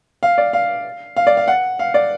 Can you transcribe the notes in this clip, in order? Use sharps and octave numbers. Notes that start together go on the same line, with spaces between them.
F5
D5
F5
F5
D5
F5
F#5
F5
D5